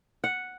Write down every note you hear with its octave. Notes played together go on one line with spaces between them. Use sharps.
F#5